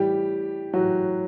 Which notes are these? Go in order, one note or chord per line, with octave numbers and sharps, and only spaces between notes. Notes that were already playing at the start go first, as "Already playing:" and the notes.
Already playing: A2 E3 G3 G4
A2 E3 F#3 F#4